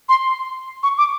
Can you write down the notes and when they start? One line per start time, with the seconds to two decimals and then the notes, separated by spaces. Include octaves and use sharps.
0.09 C6
0.83 C#6
0.98 D6